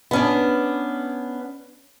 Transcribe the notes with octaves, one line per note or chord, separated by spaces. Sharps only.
B3 C#4 D4